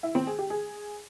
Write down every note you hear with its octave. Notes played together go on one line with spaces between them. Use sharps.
E4
C4
G#4
G4
G#4